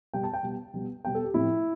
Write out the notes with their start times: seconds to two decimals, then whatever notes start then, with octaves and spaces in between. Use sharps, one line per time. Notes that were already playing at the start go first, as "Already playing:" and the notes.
0.14 B2 G3 B3 G5
0.24 A5
0.33 G5
0.43 B2 G3 B3
0.74 B2 G3 B3
1.04 B2 G3 B3 G5
1.15 A4
1.24 G4
1.34 A2 F3 C4 E4